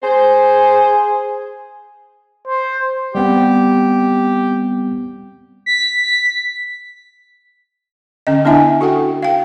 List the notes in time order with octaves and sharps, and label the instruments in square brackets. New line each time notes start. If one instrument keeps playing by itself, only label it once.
[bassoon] G#4 [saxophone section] C5
[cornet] C5
[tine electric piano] G3 B3 C4 [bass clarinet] G4
[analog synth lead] B6
[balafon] D3 C#4 D#5
B3 D4 E4 E5 G#5
F#4 A4 F#5 G5
F5 G5